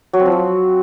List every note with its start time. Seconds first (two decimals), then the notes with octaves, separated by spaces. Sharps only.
0.13 F#3
0.20 C4
0.26 F3
0.32 F#3